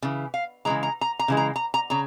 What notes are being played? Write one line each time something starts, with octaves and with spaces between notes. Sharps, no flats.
C#3 E3
F5
C#3 E3 G#3 A#5
A#5
A#5
A#5
C#3 E3 G#3
A#5
A#5
A#5
C#3 A#5